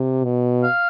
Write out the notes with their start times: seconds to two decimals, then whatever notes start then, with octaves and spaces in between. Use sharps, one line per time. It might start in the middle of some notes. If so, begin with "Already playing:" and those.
Already playing: C3
0.25 B2
0.64 F5